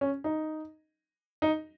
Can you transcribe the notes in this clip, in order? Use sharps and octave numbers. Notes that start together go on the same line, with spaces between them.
C#4
D#4
D#4